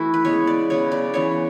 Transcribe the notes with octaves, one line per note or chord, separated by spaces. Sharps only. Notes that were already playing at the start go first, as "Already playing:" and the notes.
Already playing: E3 A3 E4 F#4
B4
C#3 G#3 B3 C#5
D5
C#3 F#3 B3 C#5
D5
C#3 E3 B3 C#5